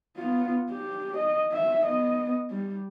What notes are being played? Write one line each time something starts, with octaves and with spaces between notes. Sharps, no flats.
B3 F4
G4
D#5
E5
B3 D#5
G3